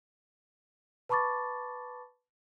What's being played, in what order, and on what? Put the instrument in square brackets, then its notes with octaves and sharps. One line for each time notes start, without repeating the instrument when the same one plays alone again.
[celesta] B4 A5 B5 C#6 D6 A6